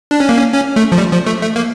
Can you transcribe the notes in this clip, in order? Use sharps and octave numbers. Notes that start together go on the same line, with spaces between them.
D4
C#4
A#3
C#4
C#4
A3
F3
G3
F3
A3
A3
A#3